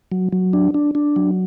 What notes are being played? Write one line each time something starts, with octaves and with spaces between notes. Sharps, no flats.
F#3
F#3
D4
D4
D4
F#3